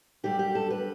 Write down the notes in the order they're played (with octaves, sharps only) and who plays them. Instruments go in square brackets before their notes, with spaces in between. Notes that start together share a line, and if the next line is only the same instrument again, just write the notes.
[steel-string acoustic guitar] F#2 D3 G3 G4
G4
A4
B4